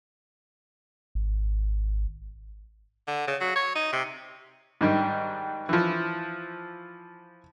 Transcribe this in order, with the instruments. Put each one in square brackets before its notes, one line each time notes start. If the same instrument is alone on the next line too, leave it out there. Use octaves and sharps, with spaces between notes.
[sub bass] G#1
[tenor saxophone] D3
C#3
F#3
C#5
D#4
C3
[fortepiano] G#2 D#3 G3
E3 F3